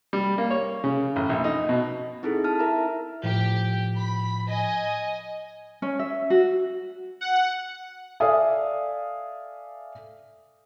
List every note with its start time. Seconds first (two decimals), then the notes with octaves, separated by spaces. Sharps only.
0.13 G3
0.38 A#3
0.51 C#5
0.84 C#3
1.16 A1
1.29 A#1
1.44 D#4
1.69 B2
2.23 C4 D#4 E4 G#4 A4
2.44 A5 F6
2.60 E4 A#4 E5 A#5
3.24 A2 F3 G4
3.95 B5
4.48 D#5 G#5
5.82 C#4
5.99 E5
6.30 F#4
7.21 F#5
8.20 A4 D5 E5 F5 G#5 D#6